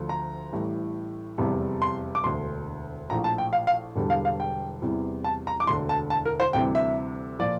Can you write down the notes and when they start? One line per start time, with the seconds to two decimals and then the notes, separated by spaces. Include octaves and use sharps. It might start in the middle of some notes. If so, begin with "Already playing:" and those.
Already playing: D2 D3 F3
0.09 A#5
0.52 A1 A2 E3 G3
1.38 F1 E2 C3 G3
1.82 C6
2.15 D6
2.24 E1 D2 D3 C6
3.10 A#1 A2 F3 A#5
3.24 A5
3.38 G5
3.53 F5
3.67 F5
3.96 E1 E2 D3 G3
4.10 F5
4.25 F5
4.40 G5
4.82 E2 C3 E3 G3
5.24 A5
5.47 A#5
5.60 D6
5.67 E1 D2 D3 C6
5.89 A5
6.10 A5
6.25 A#4
6.40 C5
6.53 D2 C3 E3 G3 G5
6.75 E5
7.39 A#2 F3 D5